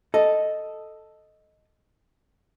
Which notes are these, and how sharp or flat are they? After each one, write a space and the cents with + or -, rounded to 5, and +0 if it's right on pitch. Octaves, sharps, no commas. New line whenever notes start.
A4 +0 D#5 +0